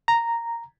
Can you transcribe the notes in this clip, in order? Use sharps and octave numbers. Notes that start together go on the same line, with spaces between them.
A#5